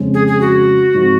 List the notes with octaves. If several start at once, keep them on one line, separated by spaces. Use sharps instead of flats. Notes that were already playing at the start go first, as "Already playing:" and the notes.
Already playing: F2 C#3 G#3
G#4
G#4
F#4
G#2 F3 C4 D#4